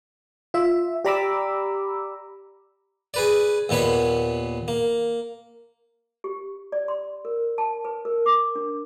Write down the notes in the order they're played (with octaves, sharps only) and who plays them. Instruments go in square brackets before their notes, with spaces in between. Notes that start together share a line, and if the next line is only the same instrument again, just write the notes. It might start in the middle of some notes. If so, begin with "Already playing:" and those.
[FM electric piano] F4 E5
G4 D5 A#5 B5 D6 E6
[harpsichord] G#4 B4 D5
D#2 A#2 B3 C#5 B5
A#3
[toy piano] G4
D5
C6
A#4
A5
B4
A#4
D6
D4